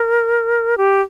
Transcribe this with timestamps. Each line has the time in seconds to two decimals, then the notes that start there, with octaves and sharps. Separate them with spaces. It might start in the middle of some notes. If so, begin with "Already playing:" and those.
Already playing: A#4
0.77 G4